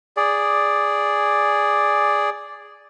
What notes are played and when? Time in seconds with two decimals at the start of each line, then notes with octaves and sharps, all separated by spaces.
0.17 G#4 D5